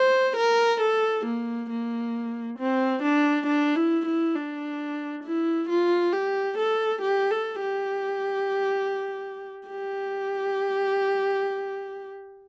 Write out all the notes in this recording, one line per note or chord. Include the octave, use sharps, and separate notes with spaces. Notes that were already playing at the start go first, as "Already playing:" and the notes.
Already playing: C5
A#4
A4
A#3
A#3
C4
D4
D4
E4
E4
D4
E4
F4
G4
A4
G4
A4
G4
G4